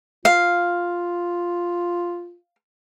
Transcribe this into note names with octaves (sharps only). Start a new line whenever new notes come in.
F4 F5